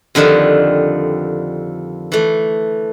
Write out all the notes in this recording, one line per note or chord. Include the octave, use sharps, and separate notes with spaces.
F2 D3 D#3 F3 G3
E3 A3